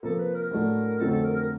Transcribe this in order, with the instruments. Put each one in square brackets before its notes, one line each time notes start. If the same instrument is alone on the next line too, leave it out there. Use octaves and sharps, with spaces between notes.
[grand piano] C3 F3 A#3 [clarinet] A4
[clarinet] B4
A#4
[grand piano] A2 F#3 A3 D4
[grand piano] F2 D3 F#3 A3 C4 [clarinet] A4
[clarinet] A4
A#4
A#4